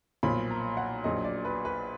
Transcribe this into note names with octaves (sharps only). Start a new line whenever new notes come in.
B1 A#2 F3 B5
A#5
F#5
A#1 A#2 F#3 D#5
D5
B4
B4